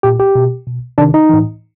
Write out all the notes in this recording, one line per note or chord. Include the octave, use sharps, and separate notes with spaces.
A#2 G4
G4
B2
B2
C3 D#3 D4
D#4
A2 E3